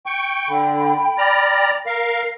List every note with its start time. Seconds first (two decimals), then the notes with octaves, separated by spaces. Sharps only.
0.06 G5 C#6
0.48 D3 G5 B5
1.18 D5 A#5 F6
1.86 A#4 F5